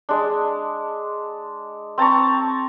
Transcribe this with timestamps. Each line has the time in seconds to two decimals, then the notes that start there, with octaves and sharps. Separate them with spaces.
0.09 G#3 D4
1.98 C4 A5 A#5 C#6